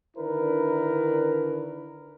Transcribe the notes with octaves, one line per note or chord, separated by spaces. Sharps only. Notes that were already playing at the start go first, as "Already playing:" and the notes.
D3 D#3 D4 E4 A#4 B4